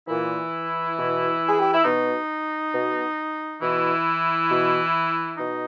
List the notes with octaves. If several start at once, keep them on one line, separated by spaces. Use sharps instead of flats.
A#2 E3 E4
B2
G#4
G4
E4
B2 D#4
B2
B2 E3 E4
B2
B2 D#4